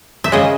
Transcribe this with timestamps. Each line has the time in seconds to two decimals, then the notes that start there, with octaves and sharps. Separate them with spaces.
0.24 E5
0.32 C#3 G#3 D#5